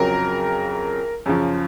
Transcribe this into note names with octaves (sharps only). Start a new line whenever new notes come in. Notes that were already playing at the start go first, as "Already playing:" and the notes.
Already playing: F2 C#3 F#3 A#4
F#2 C#3 F3